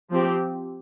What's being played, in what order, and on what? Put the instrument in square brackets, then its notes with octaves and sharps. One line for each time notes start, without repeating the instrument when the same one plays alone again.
[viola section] F3 C4 G4